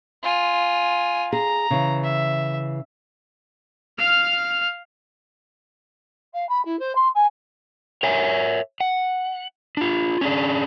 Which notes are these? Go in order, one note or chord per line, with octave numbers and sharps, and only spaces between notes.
F4 G#5
G#4 A#5
C#3 E3
E5
F5 F6
F5
B5
E4
C5
C6
G#5
A#4 C#5 E5 G#5
F#5
D4 F4
C#4 D4 G#4